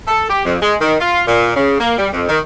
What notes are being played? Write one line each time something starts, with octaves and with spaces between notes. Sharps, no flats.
A4
G4
F2
G#3
D#3
F4
A#2
C#3
A#3
G3
F2
D#3